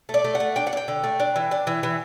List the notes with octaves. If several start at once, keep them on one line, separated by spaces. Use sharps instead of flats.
A3
D5
A3
F#5
A3
D4 G5
F#5
D4
G5
D3
A3
D4
E3
D4
E3
E3